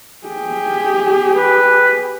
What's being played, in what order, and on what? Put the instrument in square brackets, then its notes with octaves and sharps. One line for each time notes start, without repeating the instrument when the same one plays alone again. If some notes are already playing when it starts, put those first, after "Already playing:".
[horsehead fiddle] G4 G#4
[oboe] B4